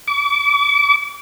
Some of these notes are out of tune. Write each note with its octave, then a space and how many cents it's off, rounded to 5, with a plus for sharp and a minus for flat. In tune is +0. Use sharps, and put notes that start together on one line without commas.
D6 -40